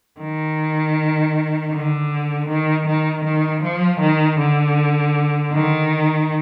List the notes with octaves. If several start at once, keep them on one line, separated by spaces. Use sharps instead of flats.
D#3
D3
D#3
D#3
D#3
F3
D#3
D3
D#3